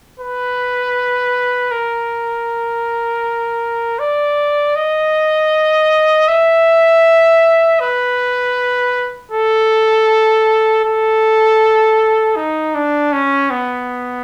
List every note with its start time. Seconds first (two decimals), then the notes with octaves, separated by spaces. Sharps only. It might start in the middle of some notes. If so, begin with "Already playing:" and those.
0.19 B4
1.71 A#4
3.99 D5
4.76 D#5
6.28 E5
7.80 B4
9.32 A4
10.84 A4
12.36 D#4
12.75 D4
13.13 C#4
13.51 B3